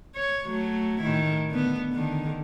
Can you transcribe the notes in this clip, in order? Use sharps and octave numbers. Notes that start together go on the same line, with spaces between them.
C#5
F#3 A3
A2 D#3 E4
D3 B3
D3 D#3